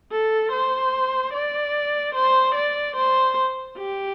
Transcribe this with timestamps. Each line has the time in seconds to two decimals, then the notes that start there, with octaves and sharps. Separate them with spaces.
0.11 A4
0.52 C5
1.34 D5
2.15 C5
2.55 D5
2.96 C5
3.78 G4